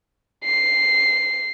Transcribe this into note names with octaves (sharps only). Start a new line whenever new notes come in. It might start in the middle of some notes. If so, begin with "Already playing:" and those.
C7